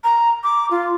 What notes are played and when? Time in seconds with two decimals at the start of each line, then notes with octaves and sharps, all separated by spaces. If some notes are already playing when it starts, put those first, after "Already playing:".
0.04 A#5
0.43 D6
0.71 F4